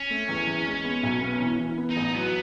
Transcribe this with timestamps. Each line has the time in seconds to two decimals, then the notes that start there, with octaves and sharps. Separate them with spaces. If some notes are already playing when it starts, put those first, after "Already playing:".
Already playing: C#4
0.11 A3
0.29 E2
0.47 E2
0.66 G#3
0.84 B3
1.03 B1
1.21 B3
1.40 E3
1.59 E3
1.78 B3
1.90 D#4
1.96 A1
2.14 F#3 B3